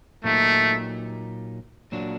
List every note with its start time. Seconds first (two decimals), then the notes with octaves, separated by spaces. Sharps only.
0.24 A#2 F#3 A3 A#3 D#4 G4
1.92 A#2 F#3 A#3 D4 F#4